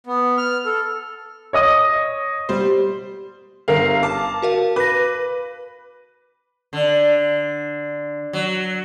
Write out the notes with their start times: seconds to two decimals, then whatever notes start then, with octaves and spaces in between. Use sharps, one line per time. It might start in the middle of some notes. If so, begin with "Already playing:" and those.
0.07 B3
0.38 F6
0.65 A4
1.53 C#5 D#5 D#6
2.49 G3 C5
3.68 G1 A#4 F5
4.03 A5 D6
4.42 F#4 A#4 F5
4.76 B4 D6 A#6
6.73 D3
8.33 F#3